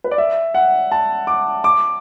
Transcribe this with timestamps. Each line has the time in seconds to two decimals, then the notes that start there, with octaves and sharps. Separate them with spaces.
0.04 B4
0.11 D5
0.18 E5
0.54 F#5
0.92 A5
1.27 D6
1.64 D6